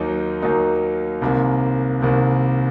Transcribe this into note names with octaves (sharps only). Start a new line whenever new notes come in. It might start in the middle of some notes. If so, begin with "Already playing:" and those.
Already playing: D#2 D#3 F#3 A#3 D#4
D#2 D#3 F#3 A#3 D#4
C2 C3 D#3 A#3
C2 C3 D#3 A#3